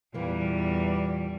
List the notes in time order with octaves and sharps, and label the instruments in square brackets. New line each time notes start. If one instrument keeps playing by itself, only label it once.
[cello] E2 G3 [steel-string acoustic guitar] A#2 E3 A#3